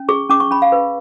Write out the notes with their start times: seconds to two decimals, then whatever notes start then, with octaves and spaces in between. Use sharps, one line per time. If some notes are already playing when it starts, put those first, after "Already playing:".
Already playing: C#4
0.09 G#4 C#6
0.30 C#4 D6
0.40 C#6
0.51 C#4 B5
0.62 F5
0.72 B4